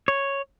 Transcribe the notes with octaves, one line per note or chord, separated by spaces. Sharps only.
C#5